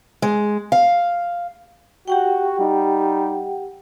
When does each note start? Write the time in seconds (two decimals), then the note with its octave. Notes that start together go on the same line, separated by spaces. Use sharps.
0.22 G#3
0.72 F5
2.08 F#4 G4 F#5 G5
2.59 G3 D#4